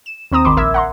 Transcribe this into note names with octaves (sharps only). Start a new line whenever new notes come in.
E7
D#2 C4 A#5 D#6 E7
G#1 D#3 B5 C6 D6
A#1 A#4 E5 E6 G#6
F#5 A#5 C6